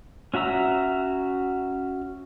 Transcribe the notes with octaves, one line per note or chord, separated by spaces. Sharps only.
C#4 F#4 E5 A#5 E6